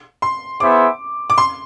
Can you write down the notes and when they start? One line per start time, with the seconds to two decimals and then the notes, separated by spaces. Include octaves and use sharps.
0.22 C6
0.60 B3 E4 G#4 C5 E5 D6
1.30 D6
1.38 C6